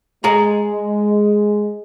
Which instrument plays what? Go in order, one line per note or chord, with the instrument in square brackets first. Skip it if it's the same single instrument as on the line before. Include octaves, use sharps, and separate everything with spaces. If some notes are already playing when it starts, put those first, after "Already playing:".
[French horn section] G#3 [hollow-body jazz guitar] G#4 A#5